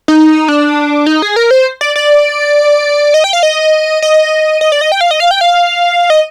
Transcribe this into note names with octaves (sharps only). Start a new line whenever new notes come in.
D#4
D4
D#4
G#4
A#4
C5
D5
D5
D#5
G5
F5
D#5
D#5
D#5
D5
D#5
G5
F5
D#5
F5
G5
F5
D#5